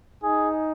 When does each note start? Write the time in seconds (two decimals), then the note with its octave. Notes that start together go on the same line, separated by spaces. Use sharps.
0.24 D#4 G#4